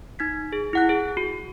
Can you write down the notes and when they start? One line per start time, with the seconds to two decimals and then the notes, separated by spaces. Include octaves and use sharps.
0.19 D#4 G#6 B6
0.53 G#4
0.73 E4 F#5 F#6
0.89 G#4
1.17 F#4